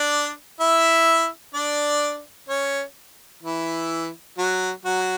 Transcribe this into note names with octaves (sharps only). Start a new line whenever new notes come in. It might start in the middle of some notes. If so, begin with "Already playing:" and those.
Already playing: D4 D5
E4 E5
D4 D5
C#4 C#5
E3 E4
F#3 F#4
F#3 F#4